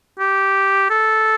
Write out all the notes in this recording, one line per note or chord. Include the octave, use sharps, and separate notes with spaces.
G4
A4